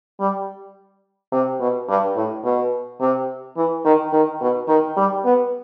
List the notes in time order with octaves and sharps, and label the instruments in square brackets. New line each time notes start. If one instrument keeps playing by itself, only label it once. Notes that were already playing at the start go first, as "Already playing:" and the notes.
[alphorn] G3
C3
B2
G2
A2
B2
C3
E3
D#3
D#3
B2
D#3
G3
B3